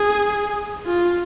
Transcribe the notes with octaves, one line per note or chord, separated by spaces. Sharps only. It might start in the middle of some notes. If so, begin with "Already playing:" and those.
Already playing: G#4
F4